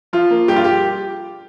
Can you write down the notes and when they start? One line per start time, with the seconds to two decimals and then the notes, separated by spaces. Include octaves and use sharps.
0.13 F3 F4
0.31 A#3
0.48 G2 G4
0.56 F4
0.64 G4